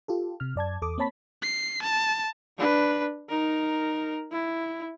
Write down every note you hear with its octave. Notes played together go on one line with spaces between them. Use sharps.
F4 G4 A4
C3 F6
F#2 D5 A5 G#6
E2 A4 D6 D#6
A#3 C4 C#5 A5 B5 B6
C7
A5
D4 B4
D#4 A#4
E4